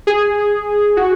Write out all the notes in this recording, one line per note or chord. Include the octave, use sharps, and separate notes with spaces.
G#4
F#4